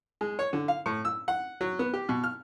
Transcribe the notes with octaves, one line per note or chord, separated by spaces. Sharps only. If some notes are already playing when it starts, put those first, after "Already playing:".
G#3
C#5
D3
F5
A2
E6
F#5
F#3
B3
G4
B2
F6